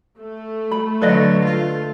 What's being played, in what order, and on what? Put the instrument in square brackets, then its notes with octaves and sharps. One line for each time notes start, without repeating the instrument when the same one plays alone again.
[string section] A3
[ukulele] B5
[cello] D3 F#3 [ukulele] B4 D5 D#5
[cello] F4